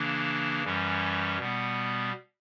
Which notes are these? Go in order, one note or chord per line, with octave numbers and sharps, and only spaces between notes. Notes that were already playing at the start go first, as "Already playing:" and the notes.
Already playing: C#3 E3 A#3 D4
F#2 E3 G3 C#4
B2 G3 B3